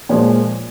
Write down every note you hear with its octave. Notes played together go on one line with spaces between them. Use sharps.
A#2 F3 G#3 C#5